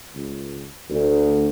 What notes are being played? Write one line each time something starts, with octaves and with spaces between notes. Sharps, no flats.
C#2
D2